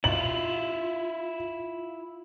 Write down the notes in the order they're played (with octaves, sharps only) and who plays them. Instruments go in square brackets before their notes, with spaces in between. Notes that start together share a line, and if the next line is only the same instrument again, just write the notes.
[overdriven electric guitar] E4 F4 [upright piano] F#7